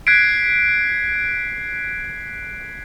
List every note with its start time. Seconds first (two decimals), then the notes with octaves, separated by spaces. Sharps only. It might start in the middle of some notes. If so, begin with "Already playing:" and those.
0.07 F#6 G#6 B6 C7 D7